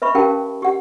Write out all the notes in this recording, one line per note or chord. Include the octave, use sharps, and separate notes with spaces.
B4 E5 B5 C#6
C#4 G4 A#4 F5 G5 A5
G4 F#5